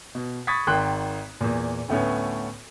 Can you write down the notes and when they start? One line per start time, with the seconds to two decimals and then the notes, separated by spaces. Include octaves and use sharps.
0.15 B2
0.47 B5 C#6 D#6 G#6 A6 B6
0.67 G#1 D#3 G5 C6 F#6
1.41 E2 A#2
1.88 D2 A2 A3 B3 C#4